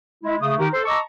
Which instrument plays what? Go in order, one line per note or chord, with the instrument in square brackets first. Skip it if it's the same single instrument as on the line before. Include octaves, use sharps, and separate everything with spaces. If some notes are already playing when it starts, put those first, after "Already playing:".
[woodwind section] G#3 E4
C#3 A3 D#6
D#3 D#4 G4
A4 C5
D#5 A5 A#5 C#6 D6 E6